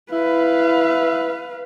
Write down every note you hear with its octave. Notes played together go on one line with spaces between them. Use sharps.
E4 B4 F5